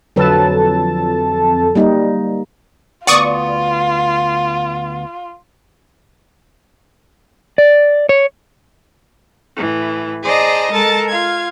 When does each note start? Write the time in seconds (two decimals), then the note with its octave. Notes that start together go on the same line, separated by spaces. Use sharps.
0.16 F2 D3 F#3 A4 B4 A5
1.75 G3 A#3 D#4
3.07 D2 B3 F4 D5 F#5 C#6 D#6
7.58 D5
8.09 C#5
9.56 A2 E3
10.23 G#4 C5 D5 D#5 A5 A#5
10.71 G#3 A4 A#4 A5 A6
11.09 F4 F5 G#6